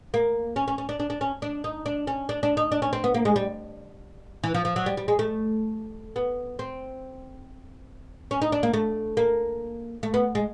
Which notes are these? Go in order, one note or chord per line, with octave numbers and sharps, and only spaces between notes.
A#3
C#4
C#4
C#4
D4
D4
D4
C#4
D4
D#4
D4
C#4
D4
D4
D#4
D4
C#4
C4
B3
A#3
G#3
G3
E3
F3
F3
F#3
G3
G3
G#3
A3
B3
C4
C#4
D#4
D4
A#3
A3
A#3
A3
B3
G#3